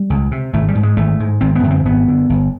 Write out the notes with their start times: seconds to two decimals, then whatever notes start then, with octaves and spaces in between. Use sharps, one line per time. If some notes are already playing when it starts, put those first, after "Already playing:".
Already playing: G3
0.10 C#2
0.31 C3
0.53 G#1 A3
0.68 G3
0.75 G#2
0.83 G#3
0.97 G#1 A3
1.20 G#2
1.41 G#1 C4
1.56 B3
1.63 F#2 D3
1.71 C4
1.85 G#1 B3
2.07 F#2 D3
2.29 G1